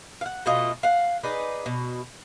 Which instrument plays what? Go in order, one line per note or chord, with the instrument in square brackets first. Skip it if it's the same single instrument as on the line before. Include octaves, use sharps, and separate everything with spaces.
[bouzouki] F5 F#5
B2 A3 F4 D#5
F5 F#5
D#4 G#4 B4 D5
B2